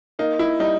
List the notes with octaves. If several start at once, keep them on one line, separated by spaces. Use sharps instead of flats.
A#3 D#4
E4
G3 D#4